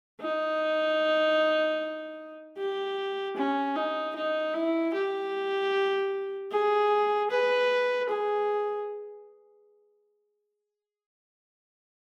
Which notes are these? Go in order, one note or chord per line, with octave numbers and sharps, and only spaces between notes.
D#4
G4
C#4
D#4
D#4
E4
G4
G#4
B4
G#4